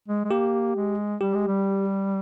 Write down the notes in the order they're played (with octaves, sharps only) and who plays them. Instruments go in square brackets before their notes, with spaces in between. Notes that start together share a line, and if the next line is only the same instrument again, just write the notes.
[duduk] G#3
G#3
[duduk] A#3 [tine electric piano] G4
[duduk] G#3
[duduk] G3 [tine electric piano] G4
[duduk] G#3
G3